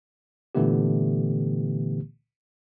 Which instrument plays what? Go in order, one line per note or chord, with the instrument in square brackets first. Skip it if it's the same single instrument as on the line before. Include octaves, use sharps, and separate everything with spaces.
[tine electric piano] A#2 D3 E3 A3 B3 G4